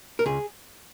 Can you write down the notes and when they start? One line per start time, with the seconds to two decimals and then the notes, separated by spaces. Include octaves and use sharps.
0.19 A#4
0.26 C#2 G#4